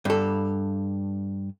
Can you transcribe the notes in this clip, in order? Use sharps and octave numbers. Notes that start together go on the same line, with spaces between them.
G2 A4